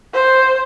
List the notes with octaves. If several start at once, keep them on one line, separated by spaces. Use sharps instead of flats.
C5